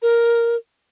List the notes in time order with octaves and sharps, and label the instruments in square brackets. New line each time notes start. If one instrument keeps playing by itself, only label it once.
[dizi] A#4